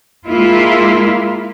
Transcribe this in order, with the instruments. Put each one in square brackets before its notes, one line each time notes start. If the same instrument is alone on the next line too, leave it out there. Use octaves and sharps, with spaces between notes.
[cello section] G#3 A#3 E4 F4